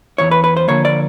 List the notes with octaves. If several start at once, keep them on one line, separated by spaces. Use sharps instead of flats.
E2 C#3 E3 C#5
B4
B4
C5
D3 F3 A#3 C#5
D5